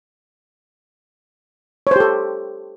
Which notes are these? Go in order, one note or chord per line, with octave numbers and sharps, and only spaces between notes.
G4 A4 C5 C#5